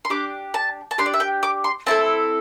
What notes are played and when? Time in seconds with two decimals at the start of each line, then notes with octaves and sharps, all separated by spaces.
0.05 C6
0.10 D4 G4 D6
0.54 A5
0.91 A5
0.98 D4 G4 C6
1.06 D5
1.14 E5
1.20 G5
1.43 D6
1.64 C6
1.86 C4 E4 A4 A5